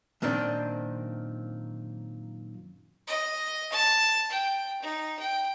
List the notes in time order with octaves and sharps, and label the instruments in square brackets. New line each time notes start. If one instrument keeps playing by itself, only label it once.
[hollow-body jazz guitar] F#2 A#2 D#3 C4 D4
[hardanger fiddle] D#5
A5
G5
D#4
G5